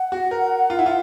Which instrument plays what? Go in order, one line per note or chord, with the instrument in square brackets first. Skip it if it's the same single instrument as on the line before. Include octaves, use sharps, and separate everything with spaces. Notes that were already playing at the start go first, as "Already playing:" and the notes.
Already playing: [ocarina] F#5
[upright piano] F#4
A#4
F4
E4
F4